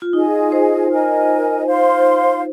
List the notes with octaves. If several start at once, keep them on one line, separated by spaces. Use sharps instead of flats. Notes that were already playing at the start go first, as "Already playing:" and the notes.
F4
D#4 F4 G#4 D#5 G#5
C5
A#4 D#5 G#5
C5 F5 C6